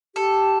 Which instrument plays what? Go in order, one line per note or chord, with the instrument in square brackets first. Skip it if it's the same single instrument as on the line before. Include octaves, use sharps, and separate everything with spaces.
[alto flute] G4 [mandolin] A4